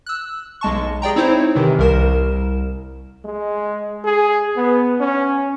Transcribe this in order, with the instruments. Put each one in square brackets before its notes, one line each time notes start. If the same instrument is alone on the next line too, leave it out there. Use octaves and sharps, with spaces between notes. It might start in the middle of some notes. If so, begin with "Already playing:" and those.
[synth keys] E6 F#6
B1 G#3 A5 C#6
G#4 D5 G5 A#5
C4 D#4 E4 C5 C#5
C3 D#3 E3
C2 A#4 E7
[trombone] G#3
G#4
B3
C#4